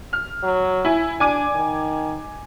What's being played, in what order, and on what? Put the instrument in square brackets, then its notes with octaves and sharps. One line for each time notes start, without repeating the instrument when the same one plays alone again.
[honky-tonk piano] F6
[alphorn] F#3
[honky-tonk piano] E4 G#5
[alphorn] D4 [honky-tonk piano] G#5 D6 D#7
[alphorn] D#3